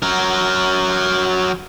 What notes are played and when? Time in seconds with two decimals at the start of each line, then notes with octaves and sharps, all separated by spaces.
0.02 F#3 A#4